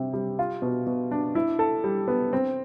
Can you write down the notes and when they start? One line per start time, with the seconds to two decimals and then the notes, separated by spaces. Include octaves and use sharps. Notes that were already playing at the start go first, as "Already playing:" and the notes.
Already playing: C3 G3
0.13 G3
0.39 F4
0.62 B2
0.87 B2
1.11 D4
1.35 E4
1.59 A4
1.84 G3
2.08 B3
2.33 C4